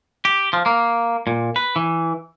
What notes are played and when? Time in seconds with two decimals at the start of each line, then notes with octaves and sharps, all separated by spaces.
0.25 G4
0.53 F3
0.66 A#3
1.27 A#2
1.56 B4
1.76 E3